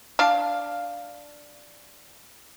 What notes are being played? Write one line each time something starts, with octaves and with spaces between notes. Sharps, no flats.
D4 F5